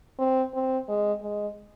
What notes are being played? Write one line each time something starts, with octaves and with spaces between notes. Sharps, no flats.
C4
C4
G#3
G#3